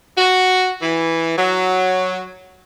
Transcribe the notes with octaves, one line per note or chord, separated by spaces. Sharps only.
F#4
E3
F#3